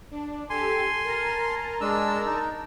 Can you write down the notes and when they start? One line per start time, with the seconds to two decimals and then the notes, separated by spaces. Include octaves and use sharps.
0.11 D4
0.50 G4 A4 G#5 C6
1.04 A#4 A5 A#5
1.81 G#3 D4 E6
2.26 D#4